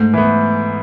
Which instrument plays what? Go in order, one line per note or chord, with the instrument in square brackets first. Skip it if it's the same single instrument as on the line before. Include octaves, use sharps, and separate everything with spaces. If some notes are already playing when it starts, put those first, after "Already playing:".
Already playing: [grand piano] G#2 [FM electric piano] A3
[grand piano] E3 B3